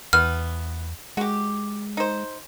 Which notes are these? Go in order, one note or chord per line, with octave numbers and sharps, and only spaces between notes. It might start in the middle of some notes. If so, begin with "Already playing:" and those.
E2 E3 B3 F6
G#3 F#4 G4
D#4 C5